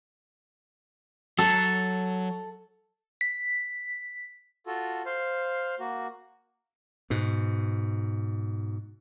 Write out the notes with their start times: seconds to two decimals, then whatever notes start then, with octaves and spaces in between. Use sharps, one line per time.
1.38 F#3 A4
3.21 B6
4.66 F4 F#4 A4
5.05 C5 F5
5.79 A#3 F#4
7.10 G#2 B2